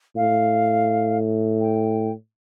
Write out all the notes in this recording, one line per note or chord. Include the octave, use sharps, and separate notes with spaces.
A2 F5
G5